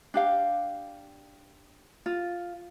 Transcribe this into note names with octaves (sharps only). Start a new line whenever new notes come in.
D4 G4 F5
F4